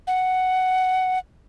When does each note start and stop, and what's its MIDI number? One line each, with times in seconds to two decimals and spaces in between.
0.07 1.18 78